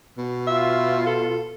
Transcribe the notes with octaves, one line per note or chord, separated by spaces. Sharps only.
B2
F4 E5
A4